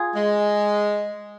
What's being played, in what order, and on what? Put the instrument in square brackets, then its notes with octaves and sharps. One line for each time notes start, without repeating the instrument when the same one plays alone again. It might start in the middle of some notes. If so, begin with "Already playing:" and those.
Already playing: [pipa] F4 G#4
[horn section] G#3